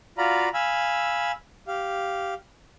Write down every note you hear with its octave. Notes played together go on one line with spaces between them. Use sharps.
F4 F#4 D5 F5 A#5 B5
F5 G#5 B5 E6
G4 F5